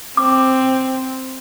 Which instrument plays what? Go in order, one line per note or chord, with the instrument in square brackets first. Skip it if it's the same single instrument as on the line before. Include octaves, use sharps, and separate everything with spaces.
[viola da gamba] C4 [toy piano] D6